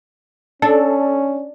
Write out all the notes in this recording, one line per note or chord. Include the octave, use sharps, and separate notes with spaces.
C#4 D4 A4